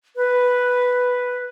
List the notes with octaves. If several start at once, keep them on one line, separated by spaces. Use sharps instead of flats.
B4